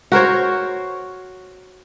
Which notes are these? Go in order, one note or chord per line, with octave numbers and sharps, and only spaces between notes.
F#4 A#4 C5 C#5